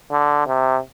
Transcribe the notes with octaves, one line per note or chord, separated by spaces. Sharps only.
D3
C3